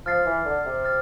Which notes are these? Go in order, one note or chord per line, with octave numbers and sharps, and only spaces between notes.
F3 F6 A6 C7
E3
D3
C3
F6 A6